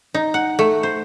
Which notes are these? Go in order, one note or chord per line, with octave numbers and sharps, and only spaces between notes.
D#4
F#5
A3
C5